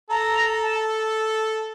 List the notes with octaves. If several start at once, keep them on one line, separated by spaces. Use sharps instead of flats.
A4 A#5
A5